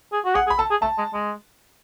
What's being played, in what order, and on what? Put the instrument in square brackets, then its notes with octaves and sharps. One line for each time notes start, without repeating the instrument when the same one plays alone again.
[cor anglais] G#4
F#4
[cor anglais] G#4 [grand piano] F#5
[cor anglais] G#4
[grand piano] B5
[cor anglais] A4 [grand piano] A5
[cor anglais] G#4
[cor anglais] A3 [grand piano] A5
[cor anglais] G#3
G#3